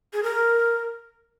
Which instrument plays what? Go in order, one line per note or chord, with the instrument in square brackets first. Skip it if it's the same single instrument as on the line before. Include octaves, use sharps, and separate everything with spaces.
[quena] G#4
A#4